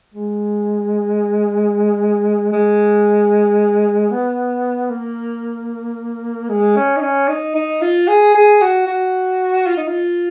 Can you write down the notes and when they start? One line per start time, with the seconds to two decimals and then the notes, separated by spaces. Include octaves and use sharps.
0.14 G#3
2.53 G#3
4.11 B3
4.90 A#3
6.49 G#3
6.76 C#4
6.97 D#4
7.02 C#4
7.28 D#4
7.55 D#4
7.81 F4
8.08 G#4
8.35 G#4
8.61 F#4
8.87 F#4
9.67 F4
9.77 D#4
9.88 F4